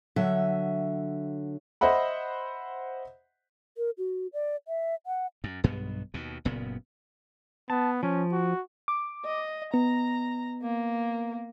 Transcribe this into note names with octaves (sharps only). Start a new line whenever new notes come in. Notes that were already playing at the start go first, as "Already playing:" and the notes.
D3 F#3 E5
C5 D#5 E5 F#5 B5
A#4
F#4
D5
E5
F#5
F#2
B1 G2 B2 B3
D#2 B2
F#1 A#2 C#3 B3
B3 A5
F3 C#4
F#4
D6
D#5
B3 A#5
A#3